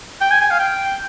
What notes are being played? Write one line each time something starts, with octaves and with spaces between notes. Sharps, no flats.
G5
G#5
G#5
F5
G5